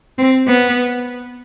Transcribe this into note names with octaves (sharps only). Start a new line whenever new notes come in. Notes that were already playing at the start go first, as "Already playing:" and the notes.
C4
B3